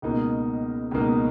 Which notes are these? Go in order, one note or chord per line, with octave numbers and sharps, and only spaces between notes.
C#2 B2 A#3 D#4 A#4
C#2 B2 A#3 D#4 A#4